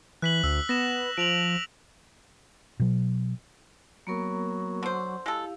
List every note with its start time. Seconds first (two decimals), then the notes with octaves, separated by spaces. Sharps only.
0.22 E3 F#6 B6 F#7
0.44 D2 E6
0.69 B3 A#6 E7
1.17 F3 D7 F7 F#7
2.80 B2 F#3
4.07 F#3 A#3 B3 A#4
4.83 D3 C5 F#5
5.26 G#3 E4 G4 A4 F5